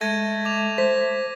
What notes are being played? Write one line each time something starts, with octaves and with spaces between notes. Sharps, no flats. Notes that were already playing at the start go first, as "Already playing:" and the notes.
G#3 A3 G#6 A#6 D#7
D6 F7
C5 B6